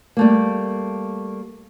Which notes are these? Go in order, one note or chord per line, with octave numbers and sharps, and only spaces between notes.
G3 A3 A#3